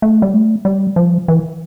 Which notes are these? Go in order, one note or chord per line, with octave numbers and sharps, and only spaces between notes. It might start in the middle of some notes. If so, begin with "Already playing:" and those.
A3
G3
A3
G3
F3
E3